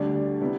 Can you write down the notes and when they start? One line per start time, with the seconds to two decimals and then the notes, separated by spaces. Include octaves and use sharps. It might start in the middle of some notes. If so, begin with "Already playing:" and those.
Already playing: D2 D3 G3 D4
0.41 C3 G3 B3 E4